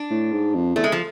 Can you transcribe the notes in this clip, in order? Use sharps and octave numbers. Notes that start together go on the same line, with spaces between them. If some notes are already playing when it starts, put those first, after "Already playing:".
Already playing: D4
A2
G#2
F2
E2 A3
G#3
F3